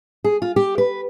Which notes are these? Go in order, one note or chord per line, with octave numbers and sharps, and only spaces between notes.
G#4
F4
G4
B4